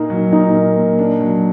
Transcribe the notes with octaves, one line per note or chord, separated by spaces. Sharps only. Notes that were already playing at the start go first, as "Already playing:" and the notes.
Already playing: A#2 A#3 D#4
F#3
A#2 D#4
A#3
A#2
D4
F#3